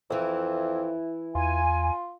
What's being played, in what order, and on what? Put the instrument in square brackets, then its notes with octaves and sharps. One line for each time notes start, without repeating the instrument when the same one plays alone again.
[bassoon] F2 [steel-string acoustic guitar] E3 E4
[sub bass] E2 [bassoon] F4 [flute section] G#5